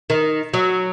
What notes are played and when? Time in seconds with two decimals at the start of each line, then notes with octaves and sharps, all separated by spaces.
0.10 D#3
0.54 F#3